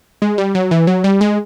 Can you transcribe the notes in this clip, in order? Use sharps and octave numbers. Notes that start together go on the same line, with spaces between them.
G#3
G3
F#3
E3
F#3
G3
G#3